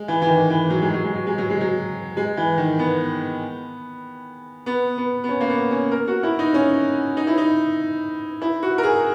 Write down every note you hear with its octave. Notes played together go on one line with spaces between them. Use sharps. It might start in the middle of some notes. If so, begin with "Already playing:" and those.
Already playing: G#3
E3
E3
D#3
E3
F#3
G#3
F#3
G#3
F#3
G#3
F#3
G#3
F#3
G#3
E3
D#3
B3
B3
B3
B3
C#4
A#3
B3
C#4
A#4
F#4
E4
D#4
C#4
D#4
E4
D#4
E4
F#4
A#4
G#4